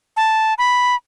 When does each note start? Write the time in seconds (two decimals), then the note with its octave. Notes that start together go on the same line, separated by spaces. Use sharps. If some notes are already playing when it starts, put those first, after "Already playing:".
0.17 A5
0.58 B5